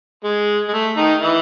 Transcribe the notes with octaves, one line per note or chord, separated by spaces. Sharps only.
G#3
G#3
A3
D#3 D#4
E3 E4